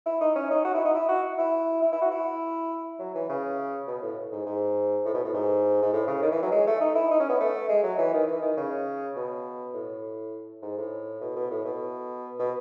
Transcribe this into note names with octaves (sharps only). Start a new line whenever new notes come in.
E4
D#4
C#4
D#4
F#4
E4
D#4
E4
F#4
E4
E4
E4
F#4
E4
F#3
E3
C#3
B2
A2
G#2
G#2
A2
B2
A2
G#2
G#2
A2
C#3
D#3
E3
F#3
G#3
A3
D#4
E4
D#4
C#4
B3
A3
G#3
F#3
E3
D#3
E3
D#3
C#3
B2
A2
G#2
A2
B2
B2
A2
B2
B2